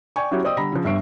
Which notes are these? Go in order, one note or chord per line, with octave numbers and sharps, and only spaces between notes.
D5 G5 G#5 C#6
F#3 C#4 E4 F#4 G4
C5 D5 D#5 G5 D#6 E6
D3 G3 A#5 B5 A#6
C#3 F3
G1 G2 E5 C#6 C7 D7